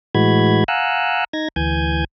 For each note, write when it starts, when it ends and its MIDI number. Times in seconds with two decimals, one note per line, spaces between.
0.15 0.64 45
0.15 0.64 52
0.15 0.64 56
0.15 0.64 66
0.15 0.64 83
0.15 0.64 92
0.68 1.25 77
0.68 1.25 78
0.68 1.25 80
0.68 1.25 82
0.68 1.25 88
0.68 1.25 90
1.33 1.48 63
1.33 1.48 92
1.33 1.48 94
1.56 2.05 38
1.56 2.05 52
1.56 2.05 80
1.56 2.05 91
1.56 2.05 92